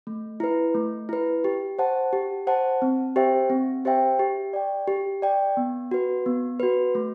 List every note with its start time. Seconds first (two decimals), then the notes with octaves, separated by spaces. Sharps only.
0.07 A3
0.40 E4 B4
0.75 A3
1.09 E4 B4
1.44 G4
1.79 C5 F#5 A5
2.13 G4
2.47 C5 F#5 A5
2.82 C4
3.16 G4 C5 E5 G5
3.50 C4
3.85 G4 C5 E5 G5
4.19 G4
4.53 D5 G5
4.88 G4
5.22 D5 G5
5.57 B3
5.91 F#4 B4
6.26 B3
6.60 F#4 B4
6.95 A3